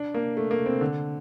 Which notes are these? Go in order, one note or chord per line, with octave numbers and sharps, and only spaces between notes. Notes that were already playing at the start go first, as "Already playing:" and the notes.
Already playing: D4
A#3
A3
A#3
C4
D3